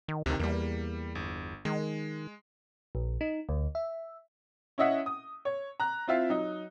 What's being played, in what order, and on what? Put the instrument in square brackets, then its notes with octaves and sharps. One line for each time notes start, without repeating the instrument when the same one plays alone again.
[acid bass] D#3
[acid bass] D2 [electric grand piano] C3 D#3
[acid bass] E2 [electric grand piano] G3 A#3
[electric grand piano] G1
[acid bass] D#3 [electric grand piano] G#3
[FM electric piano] A#1
D#4
D2
E5
[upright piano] C#4 E4 D#5 E5 F#5
D#6
C#5
A#5 F#6
C4 E4 F4 E5 F5
F#3 D#4